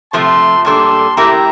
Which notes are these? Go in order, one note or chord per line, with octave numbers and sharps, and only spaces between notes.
C3 F3 A3 A5 C6
A#2 G3 D4 A4 A5 C6
A3 E4 G4 A#4 G5 A#5